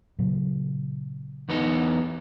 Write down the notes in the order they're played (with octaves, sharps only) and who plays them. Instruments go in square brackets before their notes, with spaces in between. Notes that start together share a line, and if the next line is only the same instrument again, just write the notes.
[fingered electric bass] A#2 C#3 F#3
[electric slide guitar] E2 B3 D#4